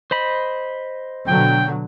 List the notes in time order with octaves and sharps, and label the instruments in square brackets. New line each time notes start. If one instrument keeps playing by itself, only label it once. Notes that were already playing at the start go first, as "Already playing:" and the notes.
[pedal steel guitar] C5 D#5 B5
[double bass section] B2 D3 F#3 [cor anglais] G5